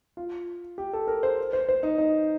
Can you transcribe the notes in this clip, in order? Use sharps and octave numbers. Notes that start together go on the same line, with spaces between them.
F4
G4
A4
A#4
C5
C5
C5
D#4
D#4